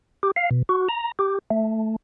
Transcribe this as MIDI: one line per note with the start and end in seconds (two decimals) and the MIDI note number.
0.23 0.31 67
0.36 0.49 77
0.51 0.62 47
0.69 0.88 66
0.89 1.12 82
1.19 1.39 67
1.50 1.96 57